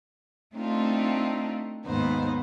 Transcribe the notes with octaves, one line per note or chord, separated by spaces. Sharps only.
A3 C4 D4 D#4 F4
D#2 G#2 B3 D#4 C5